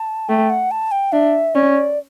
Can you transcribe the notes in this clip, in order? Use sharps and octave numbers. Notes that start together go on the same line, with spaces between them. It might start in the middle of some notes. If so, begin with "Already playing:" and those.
Already playing: A5
A3 G5
F#5
A5
G5
D4 E5
C#4 D5